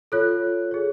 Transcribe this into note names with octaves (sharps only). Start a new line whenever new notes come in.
F4 A4 C#5 F#6
G#4 C#5